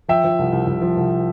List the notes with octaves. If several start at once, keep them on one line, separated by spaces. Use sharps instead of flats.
F3 E5 G5
F3
C2
C2
C2
F3
C2